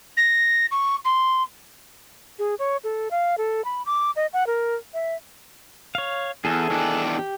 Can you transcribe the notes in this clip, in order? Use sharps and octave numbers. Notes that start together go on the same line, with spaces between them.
A#6
C#6
C6
G#4
C#5
A4
F5
A4
B5
D6
D#5
F#5
A#4
E5
C#5 F5
E2 G#4 A4 G#5
E2 D#3 D4
G4